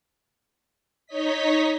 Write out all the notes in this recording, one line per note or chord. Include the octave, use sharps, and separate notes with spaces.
D#4 C#5 D#5 B6